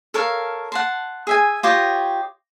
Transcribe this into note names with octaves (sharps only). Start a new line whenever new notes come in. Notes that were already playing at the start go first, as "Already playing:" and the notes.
A4 A#4 C#5 F5
F#5 A5 C6
G#4 E5 G#5
F4 G4 C#5 D#5